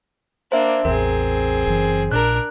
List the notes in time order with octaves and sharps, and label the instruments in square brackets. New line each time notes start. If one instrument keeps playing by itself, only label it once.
[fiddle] A#3 D4 [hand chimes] C5 E5
[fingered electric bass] A1 E2 [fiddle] C4 G#4 [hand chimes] A#4
[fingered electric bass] F#1 E3
[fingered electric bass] A#1 A#2 [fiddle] D4 A#4 [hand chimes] F#6